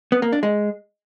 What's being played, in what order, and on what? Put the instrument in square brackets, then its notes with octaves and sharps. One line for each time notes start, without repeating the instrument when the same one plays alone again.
[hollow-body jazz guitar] B3
A#3
D4
G#3